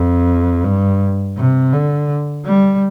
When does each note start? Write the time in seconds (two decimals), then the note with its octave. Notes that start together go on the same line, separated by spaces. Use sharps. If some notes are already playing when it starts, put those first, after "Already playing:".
Already playing: F2
0.64 G2
1.37 C3
1.73 D3
2.45 G3